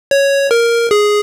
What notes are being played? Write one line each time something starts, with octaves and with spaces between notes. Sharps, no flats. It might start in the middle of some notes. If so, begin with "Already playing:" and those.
C#5
A#4
G#4